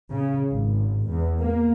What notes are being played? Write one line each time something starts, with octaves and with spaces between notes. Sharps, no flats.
C#3
G#1
E2
A#3